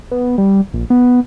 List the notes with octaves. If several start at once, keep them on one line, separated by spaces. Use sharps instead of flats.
B3
G3
A#1
B3